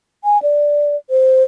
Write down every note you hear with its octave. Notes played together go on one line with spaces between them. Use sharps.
G#5
D5
C5